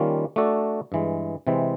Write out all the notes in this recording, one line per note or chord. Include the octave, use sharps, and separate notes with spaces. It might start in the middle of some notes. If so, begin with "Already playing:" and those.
Already playing: D#3 G3 A#3 C#4 F4
A3 D4 F#4 A4 D5
G2 E3 G#3
C3 E3 G#3 C4